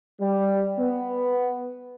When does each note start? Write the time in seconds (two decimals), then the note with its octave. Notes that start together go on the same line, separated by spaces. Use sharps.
0.20 G3
0.78 B3